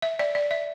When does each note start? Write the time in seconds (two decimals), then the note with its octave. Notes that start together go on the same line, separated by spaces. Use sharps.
0.02 E5
0.19 D5
0.35 D5
0.51 E5